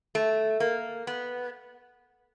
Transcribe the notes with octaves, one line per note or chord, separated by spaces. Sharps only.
A3
A#3
B3